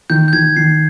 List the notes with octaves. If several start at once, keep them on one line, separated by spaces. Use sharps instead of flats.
D#3 G6
G6
D#3 G#6
D#3 C7